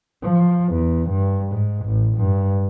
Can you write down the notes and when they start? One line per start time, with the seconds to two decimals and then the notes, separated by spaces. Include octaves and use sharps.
0.23 F3
0.74 E2
1.10 G2
1.53 G#2
1.86 A1
2.17 G2